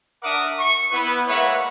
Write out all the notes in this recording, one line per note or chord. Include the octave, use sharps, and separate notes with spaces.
D4 A#4 E5 F#5 D6 D#6
C#6
B3 E4 B4
G#3 A#3 B4 C#5 E5 F#5